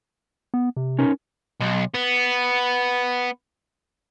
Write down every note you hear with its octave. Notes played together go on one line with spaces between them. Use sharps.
B3
C3
C#4 D#4 A#4
B1
B3